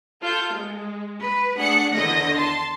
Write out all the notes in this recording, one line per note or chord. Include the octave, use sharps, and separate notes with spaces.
F4 A4 G6
G#3
B4
A3 D4 G#4 F#5 F#6 C#7
E2 D3 D#3 D#5 A#6
A5 C6